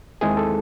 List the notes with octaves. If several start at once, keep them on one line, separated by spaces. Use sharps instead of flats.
D#2 D#3 G#3 C4 E4 G#4
A4